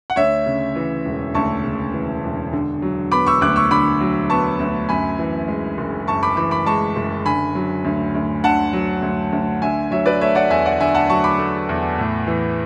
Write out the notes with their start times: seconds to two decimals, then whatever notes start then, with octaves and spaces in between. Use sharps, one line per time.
0.10 F#5
0.16 D2 C#5 E5
0.46 C#3
0.76 E3
1.05 E1
1.34 D2 A5 C#6
1.64 C#3
1.93 E3
2.23 E1
2.53 D3
2.82 F#3
3.12 B3 B5 D6
3.26 C#6 E6
3.41 D2 D6 F#6
3.56 C#6 E6
3.71 D3 B5 D6
4.01 F#3
4.30 B3 A5 C#6
4.60 D2
4.89 F#2 G#5 B5
5.19 E3
5.48 G#3
5.78 F#1
6.07 F#2 A5 C#6
6.23 B5 D6
6.37 E3 B5 D6
6.51 B5 D6
6.66 G#3 A5 C#6
6.96 F#1
7.25 D3 G#5 B5
7.55 F#3
7.85 D2
8.15 D2
8.44 D3 F#5 A5
8.73 F#3
9.02 D2
9.33 D2
9.62 D3 E5 G#5
9.91 F#3 C#5 E5
10.06 B4 D5
10.21 A3 C#5 E5
10.35 D5 F#5
10.50 E2 E5 G#5
10.65 D5 F#5
10.80 D3 E5 G#5
10.94 F#5 A5
11.10 F#3 A5 C#6
11.24 B5 D6
11.39 A3
11.69 E2
11.98 A2
12.27 E3